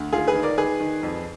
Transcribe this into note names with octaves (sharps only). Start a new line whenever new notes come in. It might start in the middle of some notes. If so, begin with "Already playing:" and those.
Already playing: D2
D#3 F4 G#4
G#4 B4
D#3
A#4 D5
D#3 G#4 B4
D#3
F2